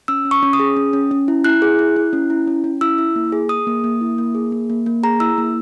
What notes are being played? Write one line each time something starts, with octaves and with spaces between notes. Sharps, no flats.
C#4 E6
C#4
C#6
C#4
D#6
G#4
C#4
C#4
C#4
E4
E4 F#6
G#4
E4
E4
C#4
E4
C#4
C#4
E4 E6
E4
A#3
G#4
G#4 D#6
A#3
A#3
E4
A#3
G#4
A#3
A#3
A#3
G#4 A#5
E4 E6
A#3